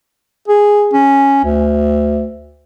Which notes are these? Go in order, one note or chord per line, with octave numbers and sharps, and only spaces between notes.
G#4
C#4
D2